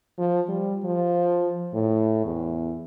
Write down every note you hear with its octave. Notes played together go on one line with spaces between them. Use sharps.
F3
G3
F3
A2
E2